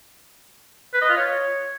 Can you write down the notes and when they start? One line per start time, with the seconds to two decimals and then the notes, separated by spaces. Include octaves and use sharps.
0.93 B4
1.01 D#5
1.09 F4
1.17 C#5